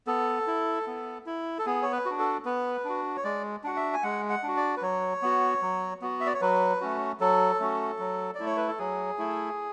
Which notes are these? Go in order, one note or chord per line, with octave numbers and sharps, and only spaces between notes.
B3 A4
E4
B3
E4
A4
B3 G#4
C#5
B4
D4 F#4
A4
B3 B4
D4 F#4
C#5
G#3 D5
D4 F#4 F#5
E5
G#5
G#3 F#5
F#5
D4 F#4
D5
B4
F#3 C#5
B3 F#4
F#3
B3 F#4
E5
D5
C#5
F#3 B4
A3 C#4 F#4
F#3 A4
A3 C#4 F#4
F#3
D5
A3 E4
C#5
B4
A4
F#3 G#4
A3 E4